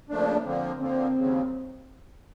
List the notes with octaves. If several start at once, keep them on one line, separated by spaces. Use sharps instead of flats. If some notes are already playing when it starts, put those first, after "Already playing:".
C#3 F3 A3 A#3 D4
D3 F3 A#3 C4
D3 F3 A#3 C4
D#2 C#3 F#3